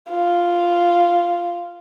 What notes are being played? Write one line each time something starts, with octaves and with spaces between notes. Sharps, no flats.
F4